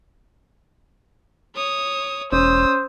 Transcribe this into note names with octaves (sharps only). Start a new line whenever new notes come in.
C#5 D#6
E1 C#4 C5 D#6 E6